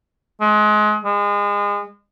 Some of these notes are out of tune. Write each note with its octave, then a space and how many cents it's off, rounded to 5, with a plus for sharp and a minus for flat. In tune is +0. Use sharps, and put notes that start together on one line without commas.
G#3 +30
G#3 -30